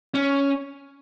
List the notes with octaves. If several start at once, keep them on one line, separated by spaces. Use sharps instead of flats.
C#4